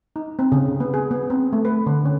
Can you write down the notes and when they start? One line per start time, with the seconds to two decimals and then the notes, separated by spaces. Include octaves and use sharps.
0.16 D#4
0.39 C4
0.52 C#3
0.80 B3
0.94 G#4
1.11 B3
1.30 C4
1.53 A3
1.65 B4
1.86 D3
2.05 C#4